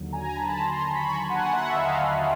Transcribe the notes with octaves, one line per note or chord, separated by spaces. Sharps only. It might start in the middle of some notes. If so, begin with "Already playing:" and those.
Already playing: D#2 D3 F#3
G#5 A#5
A5 B5
A#5 C6
B5 C#6
F#5 G#5
E5 F#5
E5
D#5 F5